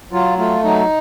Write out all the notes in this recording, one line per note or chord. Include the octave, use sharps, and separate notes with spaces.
F#3 F4
A3 F4
F#3 D#4